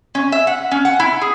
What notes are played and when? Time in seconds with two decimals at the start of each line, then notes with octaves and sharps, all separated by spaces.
0.15 C#4
0.32 E5
0.47 F#5
0.72 C#4
0.85 F#5
1.00 E4
1.21 G#4